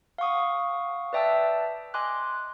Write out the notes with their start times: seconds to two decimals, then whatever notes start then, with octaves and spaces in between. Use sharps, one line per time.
0.18 F5 F#5 C#6 D#6
1.13 B4 D5 E5 G5 A5 E6
1.94 D#5 G#5 C6 D6 F#6